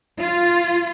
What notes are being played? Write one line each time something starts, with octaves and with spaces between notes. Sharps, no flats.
F4